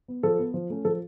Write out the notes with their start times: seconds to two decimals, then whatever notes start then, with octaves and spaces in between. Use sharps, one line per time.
0.08 B3
0.23 F3 A4
0.39 B3
0.54 F3
0.70 A3 C#4
0.85 F3 A4